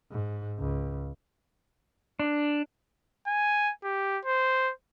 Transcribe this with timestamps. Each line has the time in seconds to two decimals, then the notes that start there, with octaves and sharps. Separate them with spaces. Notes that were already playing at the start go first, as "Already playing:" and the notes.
0.11 G#2
0.59 C#2
2.19 D4
3.27 G#5
3.84 G4
4.25 C5